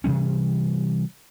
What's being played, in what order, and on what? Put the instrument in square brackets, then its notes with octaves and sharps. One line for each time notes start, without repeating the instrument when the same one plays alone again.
[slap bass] C3 E3 G3 C#4